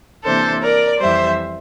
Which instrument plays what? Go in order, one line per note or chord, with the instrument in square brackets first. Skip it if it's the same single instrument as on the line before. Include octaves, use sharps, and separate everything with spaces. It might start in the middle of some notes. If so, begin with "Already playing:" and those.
[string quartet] C3 E3 A#3 D4 A4 C5
A#4 D5
F2 E3 G3 C5 E5